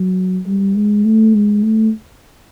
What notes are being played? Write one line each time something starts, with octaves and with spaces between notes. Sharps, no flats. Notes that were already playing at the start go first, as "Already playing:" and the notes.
Already playing: F#3
G3
G#3
A3
G#3
A3